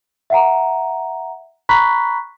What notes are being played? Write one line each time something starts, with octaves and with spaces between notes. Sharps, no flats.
E5 F#5 A#5
A#5 B5 C#6 F#6 B6